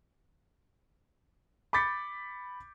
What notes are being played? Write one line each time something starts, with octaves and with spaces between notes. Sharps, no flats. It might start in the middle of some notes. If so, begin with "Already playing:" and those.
B5 D6 G6 A6 B6 C#7